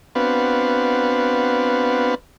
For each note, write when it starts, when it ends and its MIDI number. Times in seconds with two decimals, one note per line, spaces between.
0.15 2.15 59
0.15 2.15 60
0.15 2.15 62
0.15 2.15 66
0.15 2.15 71
0.15 2.15 77